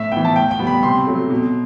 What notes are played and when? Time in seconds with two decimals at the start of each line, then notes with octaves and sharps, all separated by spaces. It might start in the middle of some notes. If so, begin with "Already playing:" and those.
Already playing: A2 E5
0.12 E3 B3 G5
0.25 A5
0.36 A2 G5
0.51 G5
0.59 G3 B3
0.67 B5
0.83 C3 C6
1.07 F#3 A3
1.30 B2